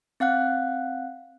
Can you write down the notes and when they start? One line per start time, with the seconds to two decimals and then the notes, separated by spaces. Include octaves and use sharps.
0.20 C4 F5 F#5 F#6